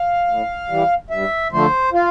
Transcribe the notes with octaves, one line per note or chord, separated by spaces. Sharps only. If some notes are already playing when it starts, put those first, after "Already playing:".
Already playing: F5
A2
E3 G3
G2 E5
D3 F3 A3 C5
F4